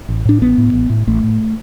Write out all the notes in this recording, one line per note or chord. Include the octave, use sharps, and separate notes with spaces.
A1
A2 D4
A1 B3
A2
A1
A2
A1 A3
A2